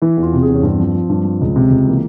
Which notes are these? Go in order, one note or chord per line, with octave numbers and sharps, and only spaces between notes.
E3 E4
E2
F4
C3
G#4
E2
C#4
G2 C4
F3
F3
G2
F3
C#2
C3
C#2
E3 A#3